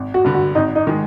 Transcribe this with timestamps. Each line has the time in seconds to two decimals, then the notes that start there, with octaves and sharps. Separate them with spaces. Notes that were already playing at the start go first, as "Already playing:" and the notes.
Already playing: G#1
0.14 F#4
0.24 G2 D3
0.34 F#4
0.55 G#1 D#4
0.75 D#4
0.87 D#3 G#3